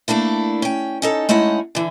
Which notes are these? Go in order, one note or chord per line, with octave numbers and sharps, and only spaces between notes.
A3 A#3 D4 E4
C#4 G5
C#4 D#4 A4
G#3 A3 C#4 D#4 E4 F#5
D3 E3